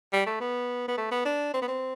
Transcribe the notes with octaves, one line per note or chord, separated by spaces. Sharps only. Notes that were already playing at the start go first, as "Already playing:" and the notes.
G3
A3
B3
B3
A3
B3
D4
C4
B3
C4